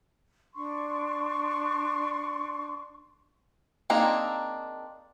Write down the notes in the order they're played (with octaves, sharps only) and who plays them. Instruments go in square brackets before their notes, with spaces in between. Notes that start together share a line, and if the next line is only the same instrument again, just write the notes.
[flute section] D4 C6 C#6
[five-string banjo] A#3 C4 D4 D#4 G#4